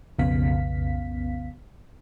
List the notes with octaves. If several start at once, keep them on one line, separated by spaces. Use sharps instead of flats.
B1 F2 C#3 B3 F5 B6